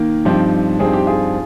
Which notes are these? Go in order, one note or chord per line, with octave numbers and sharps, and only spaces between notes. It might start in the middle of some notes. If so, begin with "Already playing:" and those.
Already playing: D#3 A#3
G2 F3 C4 D#4 G4
G2 F3 C4 D#4 G#4
G4
F4 G#4